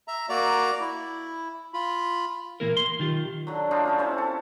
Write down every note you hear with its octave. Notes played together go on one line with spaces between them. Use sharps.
E5 A#5
A#3 F#4 D5 A#5
E4
F4 B5
A#2 E3 A#3 E4 A#4
C6
B1 D#3 F4 G4
D3 F#3
D4 D#4 F4
C#4 D#4 E4
C3 C4 C#4
A4